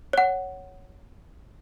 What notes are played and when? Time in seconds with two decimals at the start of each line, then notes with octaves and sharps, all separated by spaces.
0.13 C#5 F#5